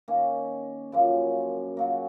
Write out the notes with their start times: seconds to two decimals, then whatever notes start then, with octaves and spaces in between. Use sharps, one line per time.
0.08 D#3 A#3 C#4
0.92 F#2 C#3 F3 A#3
1.77 C#3 F#3 A#3